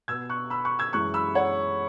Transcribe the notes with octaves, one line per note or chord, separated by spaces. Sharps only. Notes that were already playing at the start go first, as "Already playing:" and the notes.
B2 B3 E6 G#6
C#6 F#6
B5 E6
C#6 F#6
E6 G#6
F#2 E3 G#3 C#6 F#6
B5 E6
C#5 F#5